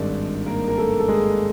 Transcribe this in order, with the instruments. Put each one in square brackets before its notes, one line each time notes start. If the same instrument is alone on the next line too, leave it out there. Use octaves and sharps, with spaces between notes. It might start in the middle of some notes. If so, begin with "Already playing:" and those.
Already playing: [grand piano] G#1 G2 D#3 G#3 D4 D5
A#3 A#4
A#4
A3 A4
A4
G#3 G#4